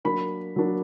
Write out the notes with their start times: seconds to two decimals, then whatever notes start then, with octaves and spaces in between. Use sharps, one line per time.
0.05 F#3 A#3 D4 B5
0.56 F#3 A#3 D4